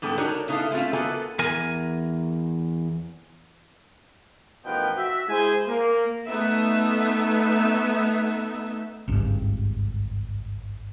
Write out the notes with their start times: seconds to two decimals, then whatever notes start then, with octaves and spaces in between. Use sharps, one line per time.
0.02 G#2 G3 B3 A4 G5
0.18 D4 D#4 F#4 A#4 C#5 D#5
0.48 C#3 B3 D#4 E4 A4 F5
0.71 G#3 A3 C4 C#4 F4
0.93 A#3 B3 F#4 A4 D#5 G#5
1.39 E2 A#4 G#5
4.65 A1 B2 D#3 F3 B4 G5
4.96 F#4 E5
5.29 G#3 E4 G#4 C5 G#5
5.68 A#3
6.26 A3 B3 D#4 E5
9.08 G#1 C#2 G2